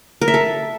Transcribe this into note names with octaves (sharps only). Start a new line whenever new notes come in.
A#4
E5
A4